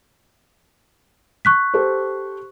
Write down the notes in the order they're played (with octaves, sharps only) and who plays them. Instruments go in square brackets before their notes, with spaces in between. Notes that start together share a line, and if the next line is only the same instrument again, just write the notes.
[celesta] C#6 F#6 B6
[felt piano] G4 A4 C5